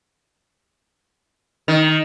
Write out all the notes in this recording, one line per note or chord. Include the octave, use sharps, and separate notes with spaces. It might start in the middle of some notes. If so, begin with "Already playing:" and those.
D#3